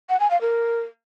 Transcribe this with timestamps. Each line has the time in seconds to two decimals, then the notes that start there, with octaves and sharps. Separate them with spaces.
0.10 F#5
0.20 G#5
0.31 F5
0.41 A#4